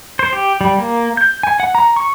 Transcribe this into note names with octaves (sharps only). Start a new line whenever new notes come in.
C5
G4
G3
A#3
G6
G#5
F#5
A#5
C#6